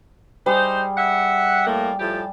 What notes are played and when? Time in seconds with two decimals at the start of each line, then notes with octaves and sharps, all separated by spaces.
0.46 G3 D#4 G#4 C5
0.97 E5 F#5
1.67 A2 A3 A#3
2.00 A2 F3 G4